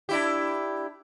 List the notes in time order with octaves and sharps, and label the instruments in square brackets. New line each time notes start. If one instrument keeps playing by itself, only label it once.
[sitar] D4 E4 G4